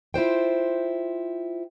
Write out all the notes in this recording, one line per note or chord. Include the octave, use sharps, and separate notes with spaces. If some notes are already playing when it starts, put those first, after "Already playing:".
E4 F4 C5 G5